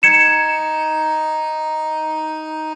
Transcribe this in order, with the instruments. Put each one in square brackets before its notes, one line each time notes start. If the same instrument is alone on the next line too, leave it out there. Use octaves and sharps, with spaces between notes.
[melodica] D#4 [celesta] G#6 C#7 E7